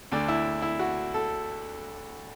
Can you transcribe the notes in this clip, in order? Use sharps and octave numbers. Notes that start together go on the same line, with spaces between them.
D2 D3 D4
E4
E4
F#4
A4